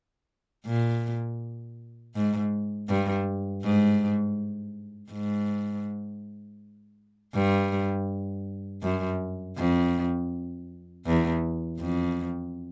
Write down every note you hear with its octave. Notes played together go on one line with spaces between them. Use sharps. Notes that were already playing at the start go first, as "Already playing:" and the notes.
A#2
G#2
G2
G#2
G#2
G2
F#2
F2
E2
F2